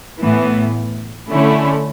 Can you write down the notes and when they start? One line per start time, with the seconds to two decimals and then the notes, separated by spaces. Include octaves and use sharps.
0.21 A2 E3 B3
1.29 D3 A3 C#4 E4